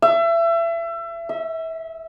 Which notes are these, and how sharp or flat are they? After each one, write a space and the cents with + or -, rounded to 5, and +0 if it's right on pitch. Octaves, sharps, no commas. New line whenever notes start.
E5 +30
E5 -25